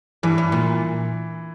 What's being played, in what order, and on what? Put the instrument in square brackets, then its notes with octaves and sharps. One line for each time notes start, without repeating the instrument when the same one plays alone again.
[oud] G2 [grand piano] E3
[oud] G2
A#2